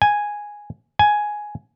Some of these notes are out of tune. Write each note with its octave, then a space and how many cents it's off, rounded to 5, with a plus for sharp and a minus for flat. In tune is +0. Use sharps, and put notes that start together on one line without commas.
G#5 -5
G#5 +5